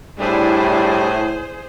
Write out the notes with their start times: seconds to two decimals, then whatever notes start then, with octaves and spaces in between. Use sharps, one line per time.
0.19 A2 G3 D4 E4 G#4 C5